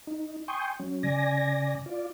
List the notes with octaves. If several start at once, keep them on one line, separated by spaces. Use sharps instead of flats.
D#4
G5 G#5 C6 C#6 D#6 G6
F#3 C#4
C#3 D5 G#5 A#6
F4 D5